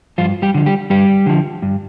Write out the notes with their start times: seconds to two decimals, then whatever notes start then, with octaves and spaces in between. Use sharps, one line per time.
0.18 G2 F3 F4
0.42 G3 G4
0.54 D3 F3
0.66 G3 G4
0.90 G2 G3 G4
1.26 D3 F3
1.62 G2